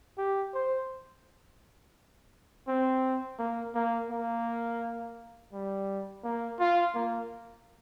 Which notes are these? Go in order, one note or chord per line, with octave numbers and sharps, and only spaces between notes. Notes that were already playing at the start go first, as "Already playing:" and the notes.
G4
C5
C4
A#3
A#3
A#3
G3
A#3
F4
A#3